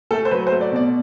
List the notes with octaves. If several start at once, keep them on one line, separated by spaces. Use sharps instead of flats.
A3 A4
C5
F#3 B4
C5
A3
D5
B2 D5